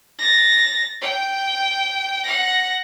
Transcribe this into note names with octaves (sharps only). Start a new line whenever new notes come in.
A6 A#6
G5
F#5 A#6